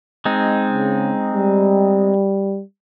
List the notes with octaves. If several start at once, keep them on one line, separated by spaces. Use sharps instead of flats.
G#3 C4 D#4
C#3
G3